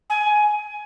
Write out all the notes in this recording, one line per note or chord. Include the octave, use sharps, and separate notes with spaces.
G#5